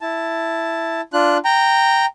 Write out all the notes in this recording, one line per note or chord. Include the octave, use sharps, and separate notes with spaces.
E4 A5
D4 F4 F#6
G5 A#5